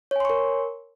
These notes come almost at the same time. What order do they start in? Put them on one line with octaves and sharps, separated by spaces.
C#5 G#5 C6 C#6 A#4